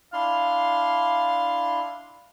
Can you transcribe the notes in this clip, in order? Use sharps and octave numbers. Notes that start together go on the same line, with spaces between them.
D4 E4 F5 C6